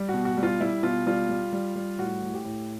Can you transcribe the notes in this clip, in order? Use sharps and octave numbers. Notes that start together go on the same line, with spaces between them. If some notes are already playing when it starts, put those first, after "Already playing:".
Already playing: G3
F#4
B2
F#4
G3
F4
G3 E4
B2 F4
G3 F4
G3
G3
G3
A2 F#4
A2
G4
A2